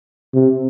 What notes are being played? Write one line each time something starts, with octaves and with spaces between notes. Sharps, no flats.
C3